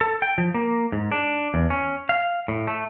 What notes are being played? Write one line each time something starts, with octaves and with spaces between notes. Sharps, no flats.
A4
G5
F3
A#3
G#2
D4
E2
C#4
F5
A2
A3